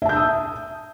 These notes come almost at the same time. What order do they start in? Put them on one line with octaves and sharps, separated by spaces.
E5 A5 G6 E6 D#6